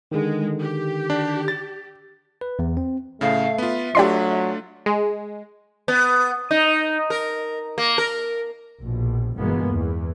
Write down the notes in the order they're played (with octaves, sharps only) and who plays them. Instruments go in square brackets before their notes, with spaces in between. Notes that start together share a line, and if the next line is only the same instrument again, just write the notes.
[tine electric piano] D3 D#3 [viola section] G#3
[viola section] G4
[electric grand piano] D4
A6
[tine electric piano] B4
E2
C4
[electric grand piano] A2 C#3 [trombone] A3 [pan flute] F5
[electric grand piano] B3 F4 [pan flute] E5
[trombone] F#3 [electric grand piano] A3 D4 F4 [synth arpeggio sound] G4 D5 C6
[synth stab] G#3
[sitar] B3
D#4
A#4
A#3
A#4
[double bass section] A#1 B2
G1 B2 E3 G#3 A#3 B3
E2 E3